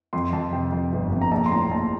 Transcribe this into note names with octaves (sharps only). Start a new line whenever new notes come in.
F2 C6
F2 A5
C3 G5
F2
G1
F2
A#5
A#1 A5
C6
A2 A#5
A#1 A5